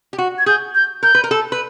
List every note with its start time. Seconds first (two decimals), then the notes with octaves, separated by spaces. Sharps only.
0.13 G4
0.18 F#4
0.39 G#6
0.46 G#4 G6
0.75 G6
1.03 A#4 G6
1.15 B4
1.24 A#4
1.31 A4
1.52 B4